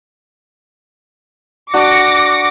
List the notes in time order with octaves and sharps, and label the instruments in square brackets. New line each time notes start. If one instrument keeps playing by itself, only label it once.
[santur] D4 F#4 [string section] D6 A#6 C#7